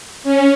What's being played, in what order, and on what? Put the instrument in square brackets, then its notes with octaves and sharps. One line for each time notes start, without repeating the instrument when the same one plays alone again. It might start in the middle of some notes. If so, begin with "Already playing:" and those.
[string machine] C#4